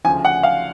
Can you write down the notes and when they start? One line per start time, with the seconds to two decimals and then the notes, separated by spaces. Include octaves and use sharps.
0.04 D2 C#3 F3 G#5
0.25 F#5
0.43 F5